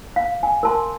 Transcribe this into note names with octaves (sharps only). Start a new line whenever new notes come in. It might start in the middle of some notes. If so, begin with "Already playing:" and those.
F5
G#5
A#4 A5 C6